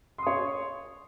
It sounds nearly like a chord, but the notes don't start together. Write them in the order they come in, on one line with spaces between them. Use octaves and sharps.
C6 D#6 C#5